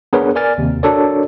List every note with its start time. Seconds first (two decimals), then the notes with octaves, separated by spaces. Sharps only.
0.13 B3 D4 G#4 A#4 B4 C#5
0.35 A#4 D5 G#5 F6 A6
0.58 D#2 C3
0.83 D4 F#4 A4 A#4 C#5 D5